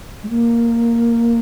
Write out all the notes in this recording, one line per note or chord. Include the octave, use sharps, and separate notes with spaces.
G#3
A#3